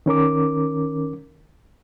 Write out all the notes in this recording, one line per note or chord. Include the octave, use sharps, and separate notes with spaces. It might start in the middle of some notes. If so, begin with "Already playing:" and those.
D#3 C#4 A#4 D6